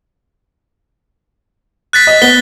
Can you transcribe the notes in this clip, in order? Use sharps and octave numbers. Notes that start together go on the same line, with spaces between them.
F#6 A6 B6
D#5
B3 B6 G7